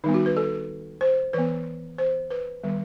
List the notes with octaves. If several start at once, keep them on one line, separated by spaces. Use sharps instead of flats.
D#3 G3 B3 D#4
F#4
B4
A4
C5
E3 B3 B4
C5
B4
D#3 G3 B3